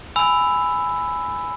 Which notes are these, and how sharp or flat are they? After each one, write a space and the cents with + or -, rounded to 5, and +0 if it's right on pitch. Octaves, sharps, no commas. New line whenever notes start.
G#5 +5 B5 +10 E6 +0